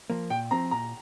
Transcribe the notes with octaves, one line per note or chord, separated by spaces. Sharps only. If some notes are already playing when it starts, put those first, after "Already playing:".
F3 A#3
A#2 G5
F3 C4 A#5
A#2 A#5